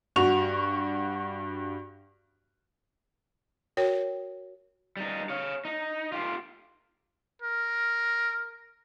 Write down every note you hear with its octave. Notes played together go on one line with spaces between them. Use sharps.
G2 F#4 C#6 F7
F#4 A#4 C#5 G5
G3 D#4
C#5 F5
D#4
F4 G4
A#4